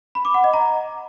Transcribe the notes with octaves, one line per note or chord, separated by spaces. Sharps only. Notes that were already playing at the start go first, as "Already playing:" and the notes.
B5
D6
F#5
D#5
A#5